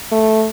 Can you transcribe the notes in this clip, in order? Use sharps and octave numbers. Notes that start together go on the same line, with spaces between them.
A3